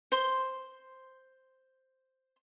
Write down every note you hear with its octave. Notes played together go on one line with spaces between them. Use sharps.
C5 C6